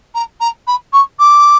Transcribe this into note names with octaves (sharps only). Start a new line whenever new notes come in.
A#5
A#5
B5
C#6
D6